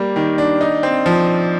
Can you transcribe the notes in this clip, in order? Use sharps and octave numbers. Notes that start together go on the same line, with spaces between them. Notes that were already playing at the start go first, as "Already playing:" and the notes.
Already playing: G3 A#3
D#3
D4
D#4
C4
F3